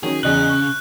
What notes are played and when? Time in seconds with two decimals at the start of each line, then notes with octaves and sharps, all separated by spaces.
0.03 D#3 F#3 C#4 G#4
0.23 E2 C#3 D#5 F#6 F#7
0.49 C#6